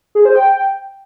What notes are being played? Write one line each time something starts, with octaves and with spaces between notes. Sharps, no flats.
G#4
C5
G5